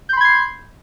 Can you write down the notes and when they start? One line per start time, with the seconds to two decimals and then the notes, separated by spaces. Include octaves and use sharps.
0.09 G6
0.13 C6
0.17 B5
0.21 G#6
0.25 C7